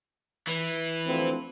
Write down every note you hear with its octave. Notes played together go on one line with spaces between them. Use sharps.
E3
D2 F3 C4